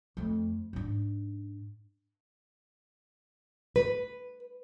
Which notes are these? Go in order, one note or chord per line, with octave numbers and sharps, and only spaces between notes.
F2 A3
G#2 D4
B4